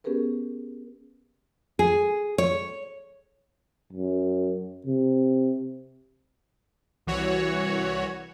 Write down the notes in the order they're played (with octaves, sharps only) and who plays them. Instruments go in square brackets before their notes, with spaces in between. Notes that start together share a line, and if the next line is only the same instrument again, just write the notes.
[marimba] B3 C#4 G4 G#4 A#4 B4
[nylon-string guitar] G#4
C#5
[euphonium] F#2
C3
[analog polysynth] C2 E3 F#4 C#5